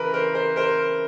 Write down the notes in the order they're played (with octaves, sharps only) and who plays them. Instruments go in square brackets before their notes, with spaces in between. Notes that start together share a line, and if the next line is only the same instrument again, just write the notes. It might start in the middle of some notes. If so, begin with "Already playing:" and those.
Already playing: [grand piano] C#3 E3 A#4 B4
A#4 C5
A#4 C5
A#4 C5
A#4